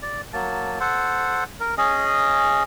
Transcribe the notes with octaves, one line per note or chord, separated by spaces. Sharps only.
D5
F#3 A#3 A5
A4 C5 F#5
A#4
C#4 G#4 D#5